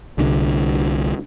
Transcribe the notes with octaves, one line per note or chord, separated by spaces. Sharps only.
C2 D3 C4 D4